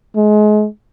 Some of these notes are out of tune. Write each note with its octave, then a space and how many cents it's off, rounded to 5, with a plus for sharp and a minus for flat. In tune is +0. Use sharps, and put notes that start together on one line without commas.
G#3 +30